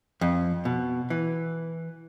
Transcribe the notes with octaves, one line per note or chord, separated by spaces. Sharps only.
F2
B2
E3